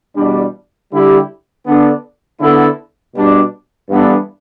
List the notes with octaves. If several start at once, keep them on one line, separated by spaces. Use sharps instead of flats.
E2 B2 G3 D4
D3 G3 E4 G4
D3 B3 D4 A4
D3 B3 E4 A4
B2 G3 D4
G2 E3 B3 D4 A4